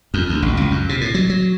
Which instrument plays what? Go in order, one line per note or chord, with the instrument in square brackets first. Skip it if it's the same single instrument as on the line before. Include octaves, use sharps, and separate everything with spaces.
[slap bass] F2
D2
A1
C#2
F#2
C3
A2
F#3
F#3